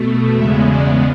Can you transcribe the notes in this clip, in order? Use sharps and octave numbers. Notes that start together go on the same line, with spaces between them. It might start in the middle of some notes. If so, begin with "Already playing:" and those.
Already playing: B2 A3
E2 C#3 G#3 B3 E5
D5